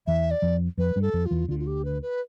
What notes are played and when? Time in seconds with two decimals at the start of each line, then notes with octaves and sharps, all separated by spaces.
0.07 E2 E3 E5
0.31 D5
0.42 F2 F3
0.78 F2 F3 B4
0.96 G2 G3
1.02 A4
1.14 F2 F3
1.26 F4
1.31 E2 E3
1.49 D2 D3 F4
1.59 F4
1.67 G4
1.85 B4
2.02 B4